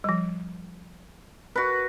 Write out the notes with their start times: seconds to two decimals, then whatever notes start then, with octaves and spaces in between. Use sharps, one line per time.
0.04 F3 G3
1.56 F#4 B4